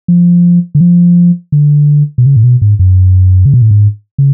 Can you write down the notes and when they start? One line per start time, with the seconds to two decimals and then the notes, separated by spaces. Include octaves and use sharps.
0.08 F3
0.75 D3
0.81 F3
1.52 D3
2.18 B2
2.26 C#3
2.36 A2
2.44 B2
2.62 G#2
2.79 F#2
3.45 C#3
3.54 B2
3.62 A2
3.71 G#2
4.18 C#3